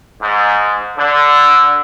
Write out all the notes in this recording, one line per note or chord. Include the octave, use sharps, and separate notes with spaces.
G#2
D3